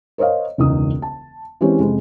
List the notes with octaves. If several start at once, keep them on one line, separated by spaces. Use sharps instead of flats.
A#4 C5 C#5 D#5 F5
E1 C#2 D#4 D#6
A5
E3 G#3 C4 C#4 G4
F2 C3 G#3